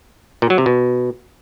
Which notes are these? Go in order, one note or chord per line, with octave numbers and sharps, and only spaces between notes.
A#2
F#3
C3
B2